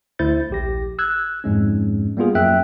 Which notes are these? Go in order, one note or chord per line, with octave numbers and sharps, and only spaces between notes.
D2 E4 C5 G6 A6
A#1 G4 A#6
E6 F#6 G#6
F2 G#2 G#3 C#4
G3 A#3 B3 F4 G#4
F#2 A#3 E5 G5 F#6